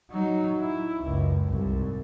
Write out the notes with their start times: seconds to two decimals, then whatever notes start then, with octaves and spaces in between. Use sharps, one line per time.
0.11 F#3 D#4
0.60 E4
1.02 F#1 C#2
1.45 C2 G#2